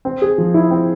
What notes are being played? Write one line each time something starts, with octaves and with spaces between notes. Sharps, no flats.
C4
G#4
F3
E4
C4